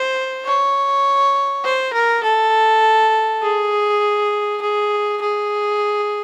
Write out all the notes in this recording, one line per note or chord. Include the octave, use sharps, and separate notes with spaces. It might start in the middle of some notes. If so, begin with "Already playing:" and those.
Already playing: C5
C#5
C5
A#4
A4
G#4
G#4
G#4